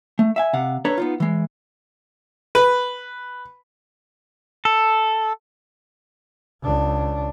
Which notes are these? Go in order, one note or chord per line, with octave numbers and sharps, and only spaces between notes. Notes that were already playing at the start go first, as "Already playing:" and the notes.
A3
E5 F5 G#5
C3 F5 F#5
D4 A4 B4 C#5 A#5
B3 D#4 F4
E3 G#3
B4
A4
C#2 D4